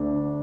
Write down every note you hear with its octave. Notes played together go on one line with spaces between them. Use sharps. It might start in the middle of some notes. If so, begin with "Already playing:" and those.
Already playing: D2 D3 A3 D4